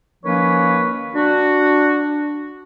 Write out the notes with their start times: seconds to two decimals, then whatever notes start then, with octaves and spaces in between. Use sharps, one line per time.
0.24 D#3 F3 A#3 C#4 B4 C#5
1.14 D4 F#4